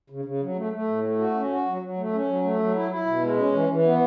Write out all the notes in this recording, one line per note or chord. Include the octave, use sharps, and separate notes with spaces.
C#3
C#3
F#3
A3
A3
A2
A3
F#4
C#4
F#4
F#3
F#3
A3
C#4
F#3
A3
F#3
E4
E4
B2
G#3
C#4
E3
E3
B3